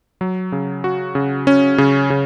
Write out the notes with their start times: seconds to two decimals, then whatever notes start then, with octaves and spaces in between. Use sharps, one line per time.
0.21 F#3
0.52 C#3
0.84 F#4
1.15 C#3
1.47 C#4
1.78 C#3
2.10 C#3